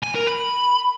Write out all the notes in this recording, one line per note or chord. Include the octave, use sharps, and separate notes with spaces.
G#5
A#4
B5